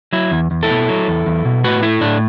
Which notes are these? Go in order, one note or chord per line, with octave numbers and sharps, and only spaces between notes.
F#3 E4
E2
E2
E4 A4
B2
F#3
E2
E2
B2
A2 F#4 B4
A3 E4
A2 D4